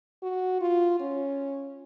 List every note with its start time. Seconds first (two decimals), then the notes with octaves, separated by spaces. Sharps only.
0.23 F#4
0.61 F4
1.00 C#4